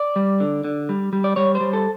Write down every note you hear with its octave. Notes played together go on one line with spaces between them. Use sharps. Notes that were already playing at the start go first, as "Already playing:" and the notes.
Already playing: D5
G3
D3
D3
G3
G3
D5
G3 C#5
C5
G3
A4